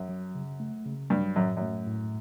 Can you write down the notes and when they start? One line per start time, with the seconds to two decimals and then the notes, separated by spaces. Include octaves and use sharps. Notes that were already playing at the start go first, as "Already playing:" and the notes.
Already playing: F#2
0.09 F#3
0.35 C#3
0.60 A3
0.86 C#3
1.10 G2 F#3
1.36 F#2 A2
1.57 F#2 A3
1.87 A2